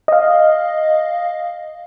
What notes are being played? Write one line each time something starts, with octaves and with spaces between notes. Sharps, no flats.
D#5 F5